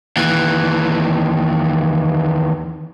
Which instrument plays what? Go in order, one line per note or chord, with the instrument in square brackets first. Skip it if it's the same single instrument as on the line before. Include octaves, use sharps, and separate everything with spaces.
[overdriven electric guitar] D#2 E3